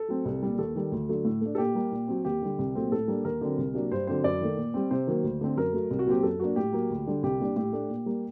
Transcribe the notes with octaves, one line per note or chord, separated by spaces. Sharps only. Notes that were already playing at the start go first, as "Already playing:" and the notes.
Already playing: A4
F#3 A3 C4
C2
A#2 G3
D#2 A4
D#3 G3
D2
D3 F#3 A3
A2
A3 D4
A4
A#2 G4
G3 A#3
A#2
F#3 C4
D#2 G4
D3 G3
C2
A#2 F#3 A3 C4
A2 A4
G3 A#3 D4
D#2 A#4
D3 F#3 C4
C2
C3 F#3 A#3 D4
G2 C5
D3 F#3 C4 C5
F#2 D5
D#3 A3
A#2
G3 C4
C3 C5
D#3 F#3 A#3
D2
D3 A3 C4
F#2 A#4
F#3 A3
C2
F#4
A#2 F#3 C4 G4
F#2 A4
F#3 A#3 D4 F#4
A2 G4
F#3 A#3
D2
D3 G3 D4
C2 G4
A#2 G3 D4
A2 G4
A3 D4
A#2
G3 A#3